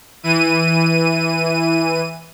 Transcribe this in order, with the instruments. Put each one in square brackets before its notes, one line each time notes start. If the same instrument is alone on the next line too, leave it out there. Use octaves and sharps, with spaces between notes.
[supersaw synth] E3 D#7